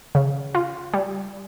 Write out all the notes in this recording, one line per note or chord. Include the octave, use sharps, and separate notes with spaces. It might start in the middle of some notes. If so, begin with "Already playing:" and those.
C#3
F4
G3